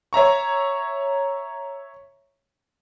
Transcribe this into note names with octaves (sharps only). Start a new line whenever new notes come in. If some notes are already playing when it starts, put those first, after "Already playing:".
C#5 E5 A#5 C#6